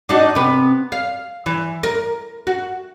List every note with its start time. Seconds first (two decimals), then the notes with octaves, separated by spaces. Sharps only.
0.09 D4 D#4 F#4
0.35 C3 B3
0.92 F5
1.46 E3
1.83 A#4
2.47 F#4